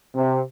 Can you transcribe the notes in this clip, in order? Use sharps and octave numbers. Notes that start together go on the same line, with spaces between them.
C3